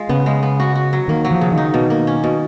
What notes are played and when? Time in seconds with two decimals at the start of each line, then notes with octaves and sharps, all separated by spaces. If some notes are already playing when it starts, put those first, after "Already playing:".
Already playing: G#3 F4
0.09 C#3 B3
0.26 G#3
0.43 B3
0.60 F#4
0.75 F#4
0.93 F#3
1.08 D#3 A#3
1.25 F#3
1.31 F3
1.41 C#3
1.52 D#3
1.58 D#4
1.74 B2
1.90 A#3
2.07 C#4
2.24 B2